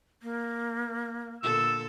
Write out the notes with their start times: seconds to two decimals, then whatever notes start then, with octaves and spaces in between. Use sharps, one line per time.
0.23 A#3
1.43 A#2 D3 A4 E6